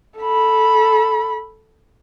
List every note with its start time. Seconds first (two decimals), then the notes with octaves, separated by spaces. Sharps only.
0.19 A4 B5